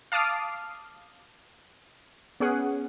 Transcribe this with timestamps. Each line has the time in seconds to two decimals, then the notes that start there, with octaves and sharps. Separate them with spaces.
0.12 F5 A5 D6 D#6 F6 C7
2.40 B3 C#4 G#4 F#5